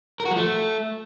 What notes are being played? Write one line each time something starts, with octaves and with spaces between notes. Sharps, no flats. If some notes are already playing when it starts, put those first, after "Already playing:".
A#4
F#4
F3
A3